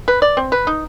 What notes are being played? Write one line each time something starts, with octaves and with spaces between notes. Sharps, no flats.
B4
D5
C4
B4
D#4